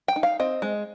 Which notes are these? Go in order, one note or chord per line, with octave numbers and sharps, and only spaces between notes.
G5
D#4
F5
C4 D#5
G#3